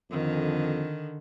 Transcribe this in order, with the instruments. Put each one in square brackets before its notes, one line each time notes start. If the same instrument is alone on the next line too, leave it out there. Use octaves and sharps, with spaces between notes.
[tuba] F2 [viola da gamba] D3 D#3